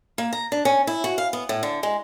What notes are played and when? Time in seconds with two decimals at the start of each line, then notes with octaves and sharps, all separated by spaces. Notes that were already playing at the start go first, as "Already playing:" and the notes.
0.18 A#3
0.33 A#5
0.52 D4
0.65 C#4
0.87 E4
1.04 F#4
1.18 F5
1.33 B3
1.49 A2
1.63 D3
1.83 G#3